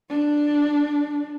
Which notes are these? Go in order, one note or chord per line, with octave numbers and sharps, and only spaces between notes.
D4